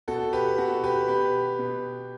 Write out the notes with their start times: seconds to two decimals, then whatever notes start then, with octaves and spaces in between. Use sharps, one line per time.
0.08 B2 F#4 A4
0.33 G4 B4
0.58 B2 F#4 A4
0.84 G4 B4
1.08 B2 G4 B4
1.59 B2